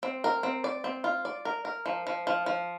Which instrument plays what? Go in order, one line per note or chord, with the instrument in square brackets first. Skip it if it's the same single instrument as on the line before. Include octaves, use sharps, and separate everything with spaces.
[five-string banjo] C4
A#4
C4
D5
C4
F4
D5
A#4
A#4
F3
F3
F3
F3